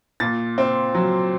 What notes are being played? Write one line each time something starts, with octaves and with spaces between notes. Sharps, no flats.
A#2 A6
C4
F#3